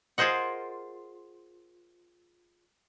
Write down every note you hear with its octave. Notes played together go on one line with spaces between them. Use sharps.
F4 G#4 A#4 C5 D#5 F#5